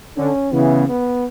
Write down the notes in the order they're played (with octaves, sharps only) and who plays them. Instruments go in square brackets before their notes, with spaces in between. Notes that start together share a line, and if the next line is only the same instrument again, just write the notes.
[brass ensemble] D3 [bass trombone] C#4
[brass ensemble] C#3 E3 [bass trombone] B3
[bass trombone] B3